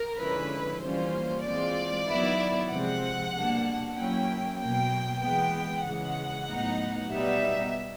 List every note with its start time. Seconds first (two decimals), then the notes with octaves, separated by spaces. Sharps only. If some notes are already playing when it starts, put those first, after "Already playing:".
Already playing: A#4
0.19 D3 F3 G#3 C#4 E4 B4
0.82 E3 G3 A#3 C#4 F4 C5
1.45 E3 G#3 C4 F4 D5
2.08 D#3 F#3 B3 E4
2.71 C3 F3 G#3 C4 F#5
3.33 B2 G3 A#3 D4
3.96 F#3 A#3 C#4 E4 G5
4.59 B2 F#3 A#3 G5
5.22 E3 G#3 B3 G5
5.85 C#3 E3 G#3 F#5
6.48 A2 F#3 B3 D#4
7.11 B2 G3 B3 D#4 E5